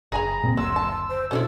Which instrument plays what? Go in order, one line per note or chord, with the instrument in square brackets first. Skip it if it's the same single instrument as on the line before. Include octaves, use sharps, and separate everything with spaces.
[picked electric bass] F#1 [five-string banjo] G#4 G#5 B5 [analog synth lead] A#5
[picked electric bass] A#2 A#3 C4
[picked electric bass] F#1 D2 [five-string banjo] F#3 [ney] C6 [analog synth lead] E6
[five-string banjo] A5
[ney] C5
[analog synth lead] B2 [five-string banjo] C#4 D#4 E4 [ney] A4